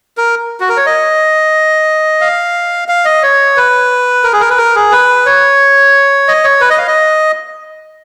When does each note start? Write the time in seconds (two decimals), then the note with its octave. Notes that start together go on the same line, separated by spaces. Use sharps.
0.17 A#4
0.60 F#4
0.69 A#4
0.77 C#5
0.86 D#5
2.21 F5
2.88 F5
3.05 D#5
3.23 C#5
3.56 B4
4.24 A#4
4.33 G#4
4.41 A#4
4.50 B4
4.58 A#4
4.75 G#4
4.92 B4
5.26 C#5
6.28 D#5
6.44 C#5
6.61 B4
6.70 D#5
6.78 F5
6.87 D#5